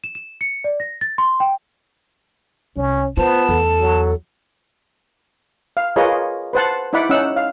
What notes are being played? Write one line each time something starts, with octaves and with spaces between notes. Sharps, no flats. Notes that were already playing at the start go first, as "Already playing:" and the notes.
E7
E7
C#7
D5
A#6
A6
C6
G5
C2 C#4
B3 F4 C5 A5
E2 A4
F#3
F5
F4 G#4 A#4 B4 C#5 D#5
B4 C5 F#5 A5
D#4 E4 D5 F#5 B5
C#4 D#4 F#5 E6
F5